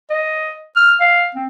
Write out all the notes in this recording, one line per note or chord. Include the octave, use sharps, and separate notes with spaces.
D#5
F6
F5
C4